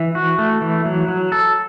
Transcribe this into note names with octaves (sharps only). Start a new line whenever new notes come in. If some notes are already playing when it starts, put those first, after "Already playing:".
Already playing: E3
F#4
A3
E3
F#3
F#3
A4